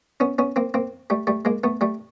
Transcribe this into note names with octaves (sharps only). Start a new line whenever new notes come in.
B3 C#4
B3 C#4
A#3 C4
A#3 C4
G3 A3
G3 A3
G#3 A#3
A3 B3
G3 A3